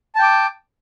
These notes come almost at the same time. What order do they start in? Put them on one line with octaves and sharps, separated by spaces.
A5 G5 D6